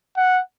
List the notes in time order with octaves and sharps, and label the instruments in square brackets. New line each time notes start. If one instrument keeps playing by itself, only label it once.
[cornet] F#5